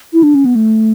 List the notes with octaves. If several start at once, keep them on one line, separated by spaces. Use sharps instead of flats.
E4
D4
C#4
B3
A3